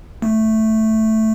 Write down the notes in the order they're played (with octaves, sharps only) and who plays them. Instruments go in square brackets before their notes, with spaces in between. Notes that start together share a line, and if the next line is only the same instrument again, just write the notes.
[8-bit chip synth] A3